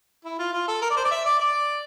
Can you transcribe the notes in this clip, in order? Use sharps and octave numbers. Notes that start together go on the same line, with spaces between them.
E4
F4
F4
A4
A#4
D5
C5
D5
E5
D5
D5